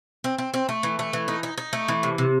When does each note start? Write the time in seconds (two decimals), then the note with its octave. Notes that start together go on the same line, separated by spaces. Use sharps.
0.24 C4
0.38 C4
0.54 C4
0.69 A3
0.83 E3
0.99 A3
1.13 E3
1.28 D#4
1.43 D#4
1.58 D#4
1.73 A3
1.88 E3
2.03 C3
2.18 C3